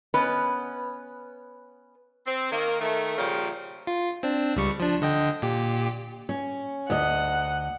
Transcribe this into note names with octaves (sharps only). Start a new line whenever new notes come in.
B3 C#4 B4 D#5
C4
D#3 A#3
D#3 A3
A#2 C#3 F3 G3
F4
C4 D4
C#2 G3 C#6
F3 D4
D3 D#5 G5
A#2 G4
C#4
D2 D#5 F#5